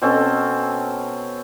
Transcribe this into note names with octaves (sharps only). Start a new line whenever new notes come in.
B2 C4 C#4 A4